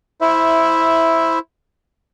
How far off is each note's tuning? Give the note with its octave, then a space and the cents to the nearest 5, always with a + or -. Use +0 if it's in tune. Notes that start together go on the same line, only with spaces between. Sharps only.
E4 -5 C5 +0 E5 +0